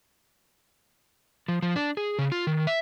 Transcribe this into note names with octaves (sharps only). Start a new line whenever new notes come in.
F3
F3
D4
G#4
C#3
F4
D#3
E5